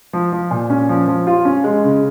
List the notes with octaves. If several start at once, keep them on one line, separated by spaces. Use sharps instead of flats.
F3
F3
A#2
C#4
F3
F3
F4
C#4
G#3
C#3